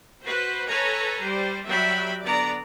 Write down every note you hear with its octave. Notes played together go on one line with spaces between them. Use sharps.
F#4 B4 C5
A4 B4 C#5 G#5 A#5
G3 C5
F#3 G3 E5 G5 B5
D3 B3 D5 A#5